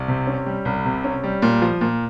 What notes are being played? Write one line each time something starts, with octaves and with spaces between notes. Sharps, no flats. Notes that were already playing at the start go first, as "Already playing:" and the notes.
Already playing: C2
C3
C#4
G3
C2
C3
C#4
G3
A#2
F3
A#2